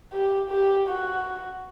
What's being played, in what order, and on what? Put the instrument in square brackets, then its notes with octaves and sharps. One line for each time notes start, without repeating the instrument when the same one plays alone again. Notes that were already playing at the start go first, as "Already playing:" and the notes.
[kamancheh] G4
G4
F#4